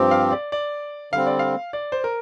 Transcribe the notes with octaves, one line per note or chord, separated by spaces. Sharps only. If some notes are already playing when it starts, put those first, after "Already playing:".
Already playing: G2 F3 C4 G4
F5
D5
D5
D3 G3 C4 F5
D5
F5
D5
C5
A#4